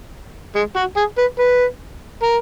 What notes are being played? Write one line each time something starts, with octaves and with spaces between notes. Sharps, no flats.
G#3
F#4
G#4
B4
B4
A#4